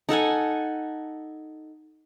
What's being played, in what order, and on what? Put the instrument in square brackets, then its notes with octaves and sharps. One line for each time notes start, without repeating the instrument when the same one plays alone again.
[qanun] D#4 A4 F#5 G#5